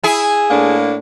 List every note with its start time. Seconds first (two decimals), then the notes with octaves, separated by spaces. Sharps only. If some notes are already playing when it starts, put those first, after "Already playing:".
0.03 E4 G#4
0.51 A2 A#3 D4